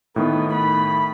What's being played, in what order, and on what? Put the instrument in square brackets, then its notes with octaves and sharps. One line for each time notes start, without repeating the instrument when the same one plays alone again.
[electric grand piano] A2 D#3 [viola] B3
[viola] B5